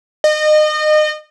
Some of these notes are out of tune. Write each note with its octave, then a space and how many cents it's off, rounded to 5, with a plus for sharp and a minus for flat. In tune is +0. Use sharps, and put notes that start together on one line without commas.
D#5 -30